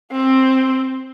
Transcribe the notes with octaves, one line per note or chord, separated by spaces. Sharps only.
C4